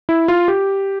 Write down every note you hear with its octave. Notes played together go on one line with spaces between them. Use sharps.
E4
F4
G4